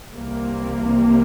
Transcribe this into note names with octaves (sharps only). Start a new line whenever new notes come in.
C2 C3 E3 G3 A#3